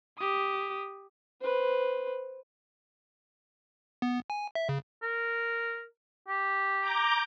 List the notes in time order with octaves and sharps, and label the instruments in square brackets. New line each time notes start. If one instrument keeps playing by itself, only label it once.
[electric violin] G4 D#6
[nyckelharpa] B4 C5
[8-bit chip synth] B3
G#5
E5
C#3
[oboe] A#4
G4
[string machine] A#5 D6 G6